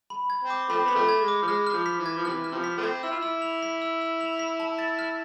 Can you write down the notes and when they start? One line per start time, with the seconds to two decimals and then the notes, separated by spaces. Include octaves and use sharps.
0.10 B5
0.30 G#6
0.43 C4
0.50 D6
0.69 F3 A3 C4 B5
0.85 B3 B5
0.95 C3 F3 A3
1.09 G#6
1.21 G#3
1.28 D6
1.42 F3
1.47 G#3 F6
1.67 G#3 F6
1.73 F3
1.86 B6
1.99 E3
2.06 G#6
2.17 F3
2.25 C3 E3 F6
2.44 F6
2.51 C3 F3
2.64 B6
2.77 F3 A3 C4
2.83 G#6
3.03 E4 E6
3.11 F4
3.20 E4 E6
3.42 F7
3.63 B6
3.82 E6
4.01 E6
4.21 F7
4.39 B6
4.60 A5
4.79 A6
4.99 F6